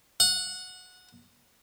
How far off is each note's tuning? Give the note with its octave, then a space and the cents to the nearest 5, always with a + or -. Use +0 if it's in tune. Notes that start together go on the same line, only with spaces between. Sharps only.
F#5 -15